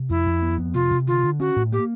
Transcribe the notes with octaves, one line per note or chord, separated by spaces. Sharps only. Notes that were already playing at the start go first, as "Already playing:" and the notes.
Already playing: C3
F2 E4
F2
B3
F2
C3 F4
C3
D3 F4
D3
C#4 F#4
A2
A#3 G4